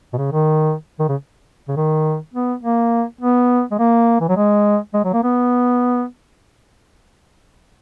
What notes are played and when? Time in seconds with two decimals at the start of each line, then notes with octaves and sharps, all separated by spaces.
0.13 B2
0.17 C#3
0.32 D#3
0.99 D#3
1.09 C#3
1.68 C#3
1.76 D#3
2.34 B3
2.63 A#3
3.21 B3
3.71 G#3
3.79 A#3
4.20 E3
4.28 F#3
4.36 G#3
4.94 G#3
5.04 F#3
5.13 A#3
5.23 B3